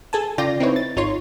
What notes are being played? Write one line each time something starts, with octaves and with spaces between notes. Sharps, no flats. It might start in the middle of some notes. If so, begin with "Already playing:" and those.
G#4 A4 G#5 A5
C#3 F4 D5 G5 A#6
C4 D#4 E4 B4 C#5
A6
G#1 D#4 F4 C#5 C6